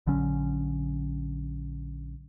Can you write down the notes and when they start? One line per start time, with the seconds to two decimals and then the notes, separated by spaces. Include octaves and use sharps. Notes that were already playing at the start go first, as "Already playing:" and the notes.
0.07 A#1 D3 F#3 C#4